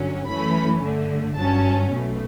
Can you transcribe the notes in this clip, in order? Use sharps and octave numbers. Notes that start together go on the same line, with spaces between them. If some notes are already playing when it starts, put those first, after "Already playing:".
Already playing: G2 D3 F#3 C#4
F#2 E3 A3 C#4 B5
G2 D3 A3
G1 G2 F#3 C#4 A5
B1 B2 A3